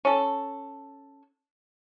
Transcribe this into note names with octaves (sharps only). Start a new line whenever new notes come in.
C#4 A4